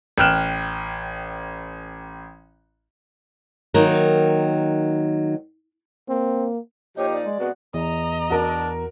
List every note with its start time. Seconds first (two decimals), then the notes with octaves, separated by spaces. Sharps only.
0.18 A1 G5 F6 F#6 E7
3.74 D#3 F#3 A#3
6.09 A#3 C4
6.97 A#2 F3 D#4 G4 C#5
7.13 D5
7.25 G#3
7.40 C3 G#3 B3 F#4
7.74 E2 D#5 A#5
8.30 D4 F#4 A#4